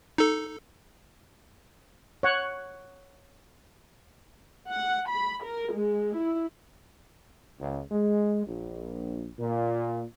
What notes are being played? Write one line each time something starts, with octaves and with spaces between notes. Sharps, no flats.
D#4 A4
C#5 F#5
F#5
B5
A#4
G#3
E4
C#2
G#3
A#1
A#2